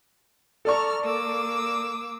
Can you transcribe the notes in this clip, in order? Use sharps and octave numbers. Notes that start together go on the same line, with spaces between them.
A4 D5 A5 A#5 C#6 F6
A#3 D6 E6